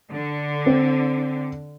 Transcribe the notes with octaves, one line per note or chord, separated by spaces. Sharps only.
D3
C4